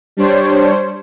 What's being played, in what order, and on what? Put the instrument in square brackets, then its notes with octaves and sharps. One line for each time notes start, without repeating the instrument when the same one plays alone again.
[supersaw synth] G3 D4 C5 C#5